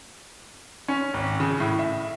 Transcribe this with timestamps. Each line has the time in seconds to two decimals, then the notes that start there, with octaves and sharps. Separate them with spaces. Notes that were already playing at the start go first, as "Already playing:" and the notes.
0.88 C#4
1.14 G#1
1.40 C#3
1.60 A2
1.79 E5